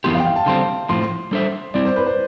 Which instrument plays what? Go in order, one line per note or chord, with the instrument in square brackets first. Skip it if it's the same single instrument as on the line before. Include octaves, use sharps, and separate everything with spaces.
[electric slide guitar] F2 E3 B3 E4 G4 [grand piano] C6
[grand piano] F5
G5
F5
A5
[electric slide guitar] D3 G3 C4 [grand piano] C6
[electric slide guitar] A2 F3 C4 [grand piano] C6
[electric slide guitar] G3 D4 A4 C5 E5
[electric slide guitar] G3 C4 E4 [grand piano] D5
[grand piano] C5
B4
C5